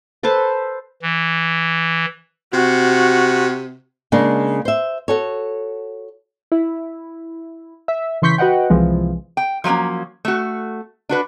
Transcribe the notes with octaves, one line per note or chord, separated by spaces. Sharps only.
A4 B4 C5 A5
E3
C3 F#4
C#3 G#3 A#3 D4
C5 E5
F#4 A4 C#5
E4
E5
C#3 E3 C6 C#6 G6 B6
F#4 B4 D#5 F#5 G5
C2 E3 F3 G#3
G5
F3 F#3 G#3 A#3 C#4
A3 F#4
D4 F#4 B4